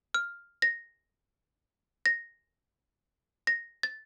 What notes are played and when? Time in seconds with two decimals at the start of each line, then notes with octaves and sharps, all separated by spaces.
0.14 F6
0.62 A#6
2.06 A#6
3.47 A#6
3.83 A6